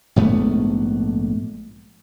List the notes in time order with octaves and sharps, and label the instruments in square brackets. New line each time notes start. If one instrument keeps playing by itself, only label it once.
[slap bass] A#1 G#2 A3 B3